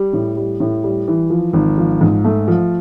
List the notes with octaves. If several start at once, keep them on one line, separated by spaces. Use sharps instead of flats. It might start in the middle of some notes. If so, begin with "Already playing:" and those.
Already playing: G3
A2
G3
A2
G3
E3
F3
G#1
F3
G#2
A3
F3